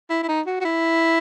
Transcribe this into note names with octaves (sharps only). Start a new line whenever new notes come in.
E4
E4
D#4
F#4
F#4
E4